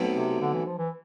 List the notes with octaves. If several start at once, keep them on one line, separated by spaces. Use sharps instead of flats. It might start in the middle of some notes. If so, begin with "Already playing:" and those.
Already playing: B1 B2 A3 C4
C3
D3
E3
F3
E3